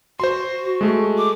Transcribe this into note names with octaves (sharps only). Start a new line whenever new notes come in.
F#4 C5 C6
G#3 A3
D6